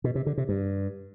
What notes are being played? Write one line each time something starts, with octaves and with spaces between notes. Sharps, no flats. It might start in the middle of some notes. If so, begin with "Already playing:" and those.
B2
C3
D3
C3
G2